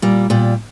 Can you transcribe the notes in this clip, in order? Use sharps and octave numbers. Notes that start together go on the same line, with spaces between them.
A#2 G3
A#2 G3